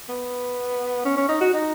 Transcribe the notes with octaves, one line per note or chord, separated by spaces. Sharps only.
B3
C#4
C#4
D#4
F#4
D#4